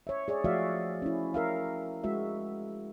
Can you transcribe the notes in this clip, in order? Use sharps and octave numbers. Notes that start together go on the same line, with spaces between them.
C#5 E5
G#4 C#5 D5
F3 A3 F#4 D5 E5 F5
C#4 E4
A#4 E5 F5
G#3 F#4 E5